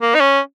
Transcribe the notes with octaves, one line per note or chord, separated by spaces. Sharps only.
A#3
D#4
C#4